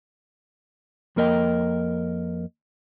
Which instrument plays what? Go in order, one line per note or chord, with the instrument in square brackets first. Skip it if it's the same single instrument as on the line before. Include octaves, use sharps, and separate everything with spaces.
[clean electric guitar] F2 A#3 A#4 D#5 G5